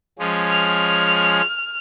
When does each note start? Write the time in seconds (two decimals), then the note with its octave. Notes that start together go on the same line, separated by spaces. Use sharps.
0.19 F3 G#3 C#4
0.51 F6